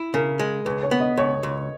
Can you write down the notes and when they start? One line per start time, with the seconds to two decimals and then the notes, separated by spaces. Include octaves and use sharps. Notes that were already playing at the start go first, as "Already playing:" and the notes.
Already playing: E4
0.14 C#3 A#4
0.39 G#3
0.65 C#2 B4
0.83 C#5
0.91 B3
1.00 D#5
1.17 C#2 C#5
1.43 C#2